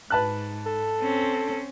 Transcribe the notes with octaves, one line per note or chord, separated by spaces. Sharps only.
G#2 B4 A5 F#6
A4
C4 C#4